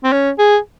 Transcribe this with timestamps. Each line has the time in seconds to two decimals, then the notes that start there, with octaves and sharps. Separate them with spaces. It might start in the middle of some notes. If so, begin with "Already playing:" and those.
0.04 C4
0.13 C#4
0.39 G#4